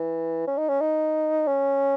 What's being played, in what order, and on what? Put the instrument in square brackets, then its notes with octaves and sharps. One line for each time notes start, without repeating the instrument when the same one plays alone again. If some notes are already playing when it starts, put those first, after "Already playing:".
Already playing: [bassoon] E3
C#4
D#4
C#4
D#4
C#4